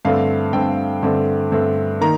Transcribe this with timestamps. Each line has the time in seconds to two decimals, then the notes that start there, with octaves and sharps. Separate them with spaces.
0.05 G2 D3 A3 C4 F5
0.53 G2 D3 A3 C4 G5
1.03 G2 D3 A3 C4
1.52 G2 D3 A3 C4
2.01 D#3 A#3 D#4 A#5